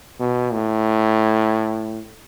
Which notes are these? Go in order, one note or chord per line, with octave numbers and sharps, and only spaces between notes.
B2
A2